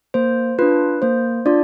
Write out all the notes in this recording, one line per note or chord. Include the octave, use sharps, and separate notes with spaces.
A#3 C5
D4 F4 B4
A#3 C5
D4 F4 D5